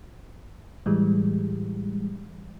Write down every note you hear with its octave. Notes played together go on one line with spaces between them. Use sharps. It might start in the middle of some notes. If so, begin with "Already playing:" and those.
A2 E3 G3 G#3